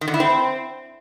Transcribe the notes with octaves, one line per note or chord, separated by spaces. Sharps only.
D#3
D3
E4
C4